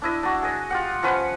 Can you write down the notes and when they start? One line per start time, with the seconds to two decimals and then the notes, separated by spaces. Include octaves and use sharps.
0.02 D4 E4 D#5
0.23 D4 F#4
0.43 G#4 D#5
0.70 F4 G4 F#5
1.03 F3 C#4 B4 F#5